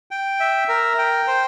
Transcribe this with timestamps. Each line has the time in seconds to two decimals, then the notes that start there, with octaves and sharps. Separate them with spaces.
0.11 G5
0.40 E5
0.68 A#4
0.99 G5
1.27 C5